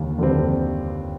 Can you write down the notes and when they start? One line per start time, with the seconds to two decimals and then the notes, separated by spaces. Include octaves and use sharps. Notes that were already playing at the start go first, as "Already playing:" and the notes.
Already playing: D#2 D3 G3
0.18 D3 G3 C4